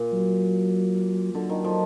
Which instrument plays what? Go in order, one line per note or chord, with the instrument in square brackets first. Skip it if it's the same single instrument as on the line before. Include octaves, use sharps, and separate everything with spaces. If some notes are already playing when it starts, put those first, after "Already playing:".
Already playing: [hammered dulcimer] A#2
[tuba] F#3
[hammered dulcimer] D3 [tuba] F#3
[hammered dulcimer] D#3
F3